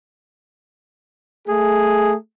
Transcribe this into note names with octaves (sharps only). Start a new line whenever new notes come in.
A3 G#4